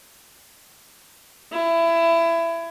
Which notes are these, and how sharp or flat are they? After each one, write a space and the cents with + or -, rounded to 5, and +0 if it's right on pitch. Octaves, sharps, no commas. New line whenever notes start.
E4 +25